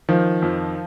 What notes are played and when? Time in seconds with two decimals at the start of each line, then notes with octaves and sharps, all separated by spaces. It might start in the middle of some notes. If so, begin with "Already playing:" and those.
0.09 D#3 F3
0.42 F2